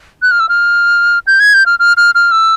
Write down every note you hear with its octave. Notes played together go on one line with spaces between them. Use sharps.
F#6
F6
E6
F6
G6
G#6
G6
F6
F6
F6
F6
E6